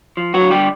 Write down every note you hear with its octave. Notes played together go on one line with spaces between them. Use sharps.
F3
F#3 F#4
D3
G3 G4